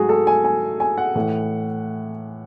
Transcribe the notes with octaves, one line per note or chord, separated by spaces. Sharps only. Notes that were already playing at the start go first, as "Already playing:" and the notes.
Already playing: G#2 F#3 A3 F#4 G#4
A4
G#5
G#5
G#5
F#5
A2 E3 A3